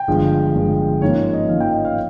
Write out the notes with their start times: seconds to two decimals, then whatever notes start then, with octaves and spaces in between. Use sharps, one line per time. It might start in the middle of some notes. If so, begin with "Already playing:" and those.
Already playing: G5
0.08 G1 G2 F3 G#3
0.54 G1 G2 F3 G#3
1.02 G#2 F3 A#3 C#4 C#5
1.18 C#5
1.33 D#5
1.49 G#2 F3 A#3 C#4 F5
1.60 G5
1.73 D#5
1.85 F5